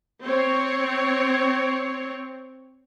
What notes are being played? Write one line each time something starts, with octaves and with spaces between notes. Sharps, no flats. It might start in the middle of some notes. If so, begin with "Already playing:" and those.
C4 C#5